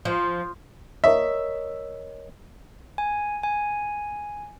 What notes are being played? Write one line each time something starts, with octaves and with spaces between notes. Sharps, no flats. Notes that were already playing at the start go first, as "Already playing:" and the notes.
F3
A#4 C#5 D#5 E5
G#5
G#5